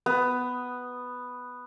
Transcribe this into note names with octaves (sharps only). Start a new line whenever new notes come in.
B3